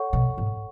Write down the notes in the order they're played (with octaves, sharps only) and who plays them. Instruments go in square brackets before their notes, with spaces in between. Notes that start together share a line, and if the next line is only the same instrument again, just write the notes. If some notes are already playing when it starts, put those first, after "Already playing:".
Already playing: [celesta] A4 C#5 F#5 C#6
[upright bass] B2
G#2